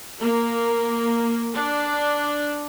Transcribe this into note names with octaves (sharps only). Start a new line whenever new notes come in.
A#3
D4